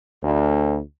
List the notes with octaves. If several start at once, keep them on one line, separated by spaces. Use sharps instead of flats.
D2